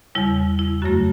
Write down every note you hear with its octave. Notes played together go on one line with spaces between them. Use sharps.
E2 C#3 G3 E4
E4
F#2 C#3 F#3 A3 F#4